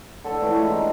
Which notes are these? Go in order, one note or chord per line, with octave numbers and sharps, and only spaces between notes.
D3 A4 C#5
E3 F3 A3 E4
G#3 D#5
D#4 G4